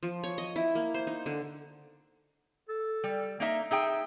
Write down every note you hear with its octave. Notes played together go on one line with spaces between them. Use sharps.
F3
C#5
D#5
E4
A#3
C5
D#4
D3
A4
G3
A#3 D#4 E5
D#4 G#4 E5 G5